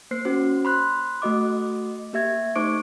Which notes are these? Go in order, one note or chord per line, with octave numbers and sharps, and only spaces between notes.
A#3 C5 C7
C#4 F#4 C5
B5 C6 F#6
A3 F#4 D#5 D6
A#3 G4 E5 G#6
A3 D#4 C5 C#6 D6 D7